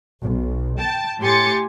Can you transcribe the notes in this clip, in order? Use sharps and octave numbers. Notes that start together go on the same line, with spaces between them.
B1
G5 A5
A2 G4 G#5 C6 A6 C#7